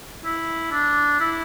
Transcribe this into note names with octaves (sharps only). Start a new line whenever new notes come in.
E4
D4
E4